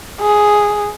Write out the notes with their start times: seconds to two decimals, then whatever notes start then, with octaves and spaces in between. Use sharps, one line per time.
0.21 G#4